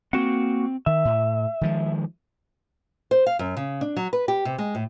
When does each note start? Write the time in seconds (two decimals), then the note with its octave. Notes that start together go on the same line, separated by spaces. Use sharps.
0.13 A#3 C4 F#4 F#5
0.86 D#3 E5
1.05 A2
1.61 D#3 F3 G#3
3.11 C5
3.26 F5
3.39 F#2
3.57 C#3
3.81 D4
3.97 F#3
4.13 B4
4.28 G4
4.45 C3
4.58 G#3
4.75 A2